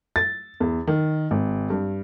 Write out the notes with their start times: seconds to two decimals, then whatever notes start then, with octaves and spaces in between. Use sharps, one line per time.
0.16 A6
0.60 E2
0.87 D#3
1.31 G#1
1.70 G2